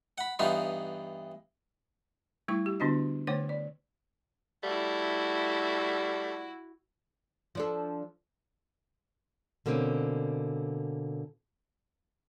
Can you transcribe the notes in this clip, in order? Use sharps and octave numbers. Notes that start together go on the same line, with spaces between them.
F#5 B5
G2 E3 B3 D#4 F4
G3 A3 E4 C#6
G4
D3 B3 D4 F#4 D#5
D3 A3 C5 C#5 F#5 D6
D5
G3 A3 E4 F#4
F3 D4 A4
B2 D3 A#3 C4 C#4